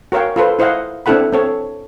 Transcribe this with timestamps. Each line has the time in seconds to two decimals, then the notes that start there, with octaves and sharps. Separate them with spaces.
0.12 F#4 A#4 C#5 F5 G5
0.36 F4 A4 B4 C5
0.59 E4 C5 D#5 F5 F#5
1.06 C4 D4 E4 A4 F#5 B5
1.33 C4 A4 C#5